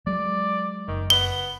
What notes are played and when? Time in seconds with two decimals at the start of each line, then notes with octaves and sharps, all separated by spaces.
0.07 F#3 G#3 D5
0.88 F#1 D#3
1.10 B3 G7